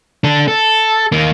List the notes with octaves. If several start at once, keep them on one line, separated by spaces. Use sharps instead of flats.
D4 A4
A4
D#3 A#3